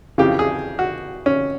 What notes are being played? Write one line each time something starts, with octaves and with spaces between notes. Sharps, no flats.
F2 C#3 E3 G4
G#4
F#4
C#4